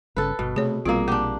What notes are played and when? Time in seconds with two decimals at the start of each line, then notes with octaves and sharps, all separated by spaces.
0.16 G1 C#3 A4 B4
0.39 G1 B2
0.56 C3 A3 G#4 C#5
0.85 A#1 B2 G3 A#3 C4 F4 G#4
1.08 A#3 D4 G4